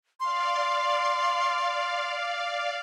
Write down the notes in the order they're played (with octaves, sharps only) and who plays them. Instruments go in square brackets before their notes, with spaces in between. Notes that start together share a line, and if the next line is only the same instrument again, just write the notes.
[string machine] D5 F5 [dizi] C6